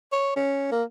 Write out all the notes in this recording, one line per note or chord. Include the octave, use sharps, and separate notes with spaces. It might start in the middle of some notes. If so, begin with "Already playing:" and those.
C#5
C#4
A#3